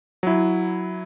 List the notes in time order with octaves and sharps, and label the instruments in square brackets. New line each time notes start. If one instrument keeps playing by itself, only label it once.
[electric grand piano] F#3 E4